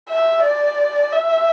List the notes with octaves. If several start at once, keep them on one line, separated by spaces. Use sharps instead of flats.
E5
D5
E5